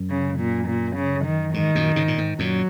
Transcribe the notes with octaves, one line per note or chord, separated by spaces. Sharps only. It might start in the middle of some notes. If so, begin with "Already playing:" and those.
Already playing: F#2
C#3
A#2
A#2
C#3
D#3
G#2 D#3
F#2 A#2
G#2 C#3
A#2
G#2
F#2 A#2 F#3